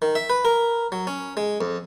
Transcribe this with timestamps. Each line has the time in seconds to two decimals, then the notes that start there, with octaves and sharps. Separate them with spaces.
0.02 D#3
0.15 E5
0.30 B4
0.45 A#4
0.92 F#3
1.07 C#4
1.37 G#3
1.61 F2